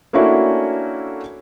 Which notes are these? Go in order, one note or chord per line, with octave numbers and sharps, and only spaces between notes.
A3 A#3 C#4 D4 E4 F#4